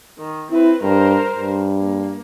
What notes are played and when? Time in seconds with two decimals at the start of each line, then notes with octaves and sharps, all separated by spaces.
0.18 D#3
0.51 C4 E4 B4
0.82 G2 A#4 C5
1.36 G2
1.78 A#3